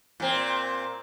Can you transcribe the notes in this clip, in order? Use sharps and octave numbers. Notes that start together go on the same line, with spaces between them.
A#2 C4